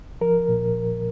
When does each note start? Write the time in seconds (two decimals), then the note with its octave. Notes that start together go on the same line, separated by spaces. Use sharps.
0.21 F3 A#4
0.49 A#2